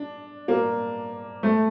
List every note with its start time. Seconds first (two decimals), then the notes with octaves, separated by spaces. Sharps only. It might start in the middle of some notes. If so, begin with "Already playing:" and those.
Already playing: D4
0.48 A#3
1.43 A3